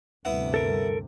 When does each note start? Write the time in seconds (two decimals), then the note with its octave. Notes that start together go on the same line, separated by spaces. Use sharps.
0.25 D2 G2 C3 B3 E4 F#5
0.54 A4 A#4